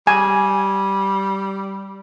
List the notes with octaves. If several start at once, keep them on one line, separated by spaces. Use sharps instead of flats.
G3 G#5